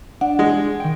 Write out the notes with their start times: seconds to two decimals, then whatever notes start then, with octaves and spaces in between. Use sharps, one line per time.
0.21 D4 F#5
0.39 G#3
0.80 D#3 G5